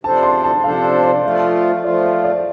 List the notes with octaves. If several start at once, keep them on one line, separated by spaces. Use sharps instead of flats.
C3 F3 D4 A4 C5 A5
C6
A5
C3 F3 D4 A4 C5 F5
F5
D5
F3 A3 F4
F3 A3 F4 D5
C5
D5